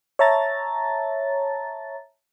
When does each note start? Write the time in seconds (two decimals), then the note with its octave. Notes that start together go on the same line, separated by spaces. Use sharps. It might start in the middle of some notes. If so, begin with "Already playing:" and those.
0.19 C#5 E5 A5 A#5 A6